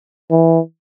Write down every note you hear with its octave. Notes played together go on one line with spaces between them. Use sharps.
E3